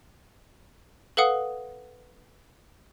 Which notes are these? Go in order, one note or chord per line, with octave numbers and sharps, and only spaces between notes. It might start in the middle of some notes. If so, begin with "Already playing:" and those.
A4 B4 F5 F#5 D#6